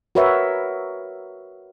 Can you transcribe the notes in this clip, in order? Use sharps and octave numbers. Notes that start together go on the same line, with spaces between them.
F#4 A#4 B4 C#5 E5